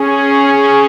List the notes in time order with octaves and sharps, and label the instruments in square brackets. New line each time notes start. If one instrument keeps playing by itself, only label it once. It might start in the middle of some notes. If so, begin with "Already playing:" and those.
Already playing: [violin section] C#4 G#4